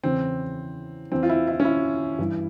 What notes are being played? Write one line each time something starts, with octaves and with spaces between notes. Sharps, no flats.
E2 C#3 E3 C4
E2 E3 C4
F4
E4
E4
C#4
E4
G2 E3